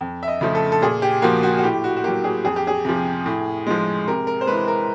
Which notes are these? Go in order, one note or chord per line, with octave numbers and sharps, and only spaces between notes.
F2
E5
D#5
C#3 F3 A3
A4
A4
A#2 G#4
G4
F3 A#3 F#4
F#4
F#4
A2 G4
F#4
F#4
F#3 A#3 G4
G#4
F2 G#4
G4
G#4
C3 F3
A2
F3 G#3
C3 A#4
A#4
C5
E3 G#3 B4
A#4